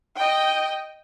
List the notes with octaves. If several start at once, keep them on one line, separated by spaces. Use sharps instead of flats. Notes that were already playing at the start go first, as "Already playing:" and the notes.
D#5 G5